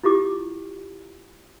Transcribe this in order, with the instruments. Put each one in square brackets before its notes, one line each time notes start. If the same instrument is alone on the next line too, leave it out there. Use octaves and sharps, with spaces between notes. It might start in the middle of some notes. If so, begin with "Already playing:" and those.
[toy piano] E4 F4 G4 D6